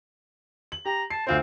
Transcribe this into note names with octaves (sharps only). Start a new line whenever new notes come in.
F#7
G4 A#5
A5 C7
D2 C4 F4 C5